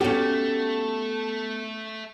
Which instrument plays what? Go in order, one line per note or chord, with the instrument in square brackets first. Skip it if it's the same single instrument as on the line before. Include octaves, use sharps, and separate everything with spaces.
[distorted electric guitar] A3 [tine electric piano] B3 A4 [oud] C#4 F#4 [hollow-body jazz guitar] G4